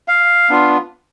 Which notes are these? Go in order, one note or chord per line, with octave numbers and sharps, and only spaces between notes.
F5
B3 D4 F4